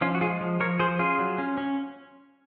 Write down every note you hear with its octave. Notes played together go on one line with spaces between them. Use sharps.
F3 C#4 F4
F#4
G#3 F4 G#4
F3
F3 A#4 C#5
F3 G#4 C5
C#4 F4 G#4
F#3
C#4
C#4